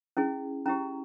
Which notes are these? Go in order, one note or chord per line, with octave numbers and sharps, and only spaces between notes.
C#4 E4 G#4
C#4 E4 G4 A#5